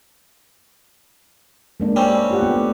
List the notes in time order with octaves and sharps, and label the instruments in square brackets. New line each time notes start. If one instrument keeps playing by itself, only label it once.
[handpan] G#3 A#3 D4
[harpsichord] G3 C4 C#4
[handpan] F4 G4 F#5
A3 B3 D4